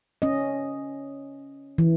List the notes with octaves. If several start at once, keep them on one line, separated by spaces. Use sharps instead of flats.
C#4 D#5
E3